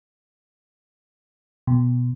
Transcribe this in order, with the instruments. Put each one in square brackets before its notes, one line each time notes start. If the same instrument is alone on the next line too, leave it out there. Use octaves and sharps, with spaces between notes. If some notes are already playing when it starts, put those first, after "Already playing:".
[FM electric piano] B2